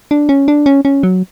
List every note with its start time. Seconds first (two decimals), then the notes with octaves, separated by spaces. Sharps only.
0.11 D4
0.29 C#4
0.48 D4
0.66 C#4
0.85 C#4
1.03 F#3